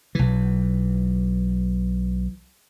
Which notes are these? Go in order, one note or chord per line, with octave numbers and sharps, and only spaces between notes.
B1 E3